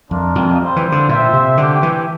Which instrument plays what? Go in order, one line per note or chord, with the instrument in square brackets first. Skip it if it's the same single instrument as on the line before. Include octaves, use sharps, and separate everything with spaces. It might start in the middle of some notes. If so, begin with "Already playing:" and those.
[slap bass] F2 [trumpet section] A3 D4 F4 A#4
[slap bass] F2
[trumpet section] G3 C4 F4 C5
[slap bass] E3
D3
[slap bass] A#2 [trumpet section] F4 C5 E5 G5
[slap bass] C3
[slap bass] D3 [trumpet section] A3 C4 G4
[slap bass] E3